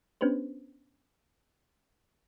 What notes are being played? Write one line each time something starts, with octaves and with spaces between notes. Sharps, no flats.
B3 C#4 D4 G4 B4 C5